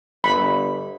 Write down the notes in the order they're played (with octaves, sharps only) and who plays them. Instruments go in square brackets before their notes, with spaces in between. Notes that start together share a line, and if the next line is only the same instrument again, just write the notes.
[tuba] G1 [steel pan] B5